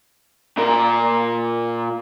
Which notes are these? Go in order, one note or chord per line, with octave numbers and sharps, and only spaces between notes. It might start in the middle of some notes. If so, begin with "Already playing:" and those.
A#2 A#4